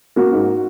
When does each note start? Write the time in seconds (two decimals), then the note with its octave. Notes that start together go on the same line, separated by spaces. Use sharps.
0.16 A#3 F#4
0.32 G#2